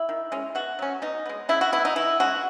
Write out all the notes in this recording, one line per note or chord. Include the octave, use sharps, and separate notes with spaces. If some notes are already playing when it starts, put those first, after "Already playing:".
Already playing: E4
D#3
G#3 C#4
B2 F#4
F#3 C#4
B2 D#4
G#3 B3
C#3 E4
F#4
E3 B3 E4
D#4
E3 E4
G#3 C#4 F#4